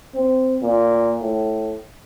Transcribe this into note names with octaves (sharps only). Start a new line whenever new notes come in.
C4
A#2
A2